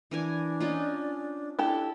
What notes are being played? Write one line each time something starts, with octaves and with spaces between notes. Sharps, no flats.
E3 D4 A#4 G#5
C#4 D#4 F4
D4 E4 G4 A4